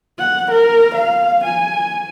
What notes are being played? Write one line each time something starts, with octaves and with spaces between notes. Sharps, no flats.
F#5
A#4
F5
G#5